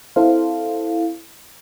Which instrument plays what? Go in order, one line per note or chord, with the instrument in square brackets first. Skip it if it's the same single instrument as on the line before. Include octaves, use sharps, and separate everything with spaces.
[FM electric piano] C4 E4 A4 C5 F5